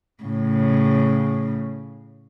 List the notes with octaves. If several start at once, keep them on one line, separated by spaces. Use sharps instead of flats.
A2 C#3